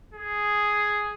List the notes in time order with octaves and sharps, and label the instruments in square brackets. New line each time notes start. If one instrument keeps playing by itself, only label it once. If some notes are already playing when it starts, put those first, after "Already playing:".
[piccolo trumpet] G#4